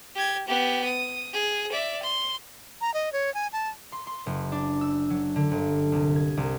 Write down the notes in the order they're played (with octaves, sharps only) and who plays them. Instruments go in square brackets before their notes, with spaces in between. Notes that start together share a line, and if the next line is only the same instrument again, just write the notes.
[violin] G4 G#6
B3 G4
D#6
G#4
D5 E5
C6
[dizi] A#5
D#5
C#5
G#5
A5
[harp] C6
C6
F#1
D4
E6
F#3
D3
G1
C2
G#6
C2